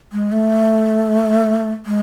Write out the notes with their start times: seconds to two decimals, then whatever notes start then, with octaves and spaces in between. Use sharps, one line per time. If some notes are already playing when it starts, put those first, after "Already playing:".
0.12 G#3
0.32 A3
1.86 G#3